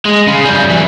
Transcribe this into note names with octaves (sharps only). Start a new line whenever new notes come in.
G#3
C#3
F#2 G3
B1 E3